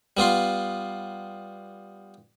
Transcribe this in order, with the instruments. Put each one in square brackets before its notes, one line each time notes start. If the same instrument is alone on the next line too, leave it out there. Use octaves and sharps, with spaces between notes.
[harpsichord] G3 B3 F4 C6